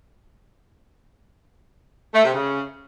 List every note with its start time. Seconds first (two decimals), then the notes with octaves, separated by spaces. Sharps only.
2.14 A3
2.24 C3
2.34 C#3